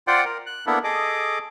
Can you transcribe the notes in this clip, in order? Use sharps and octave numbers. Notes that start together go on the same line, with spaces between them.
F4 C5 D5 F#5 G5
A#4
F#6
A#3 B3 D4 E4 A4
G#4 A4 D#5 D6